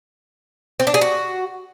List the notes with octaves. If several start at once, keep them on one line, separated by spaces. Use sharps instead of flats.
C4
D4
G#4
F#4